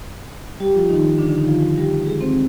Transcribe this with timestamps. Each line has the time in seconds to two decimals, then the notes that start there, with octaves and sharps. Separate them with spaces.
0.60 G3 G4
0.74 F3 F4
0.89 D#3 D#4
1.18 D3 D4
1.29 D3 D4
1.38 D#3 D#4
1.48 F3 F4
1.78 G3 G4
2.06 G#3 G#4
2.21 C4 C5